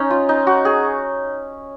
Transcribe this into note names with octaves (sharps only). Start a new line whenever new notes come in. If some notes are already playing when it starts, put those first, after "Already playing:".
Already playing: C#4 D#4
F4
D#4
F#4
G#4